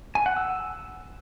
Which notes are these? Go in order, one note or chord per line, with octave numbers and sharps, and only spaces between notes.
G#5
F#5
E6